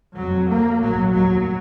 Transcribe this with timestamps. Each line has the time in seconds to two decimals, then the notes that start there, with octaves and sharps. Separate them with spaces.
0.16 F1 F2 F#3
0.48 D2 A#3
0.81 A#1 G#2 F#3
1.13 F1 D#2 F#3